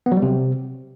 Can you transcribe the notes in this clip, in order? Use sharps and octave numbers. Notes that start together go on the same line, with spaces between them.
B3
F#3
G3
C3